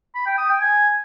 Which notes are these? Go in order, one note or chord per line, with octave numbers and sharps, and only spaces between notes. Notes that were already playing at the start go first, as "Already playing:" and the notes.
B5
G5
D#6
G5
G#5